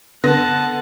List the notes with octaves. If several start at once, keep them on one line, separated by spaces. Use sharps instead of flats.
D3 B3 F#5 A5 A#6